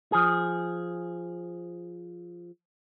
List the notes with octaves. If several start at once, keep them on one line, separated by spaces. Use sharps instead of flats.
F3 G#4